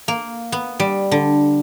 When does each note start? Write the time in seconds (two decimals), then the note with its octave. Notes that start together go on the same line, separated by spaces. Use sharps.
0.08 A#3
0.52 B3
0.80 G3
1.11 D3